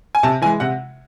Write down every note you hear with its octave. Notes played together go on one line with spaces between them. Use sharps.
G#5
C3 A5
E3 G#3 G#5
C3 F#5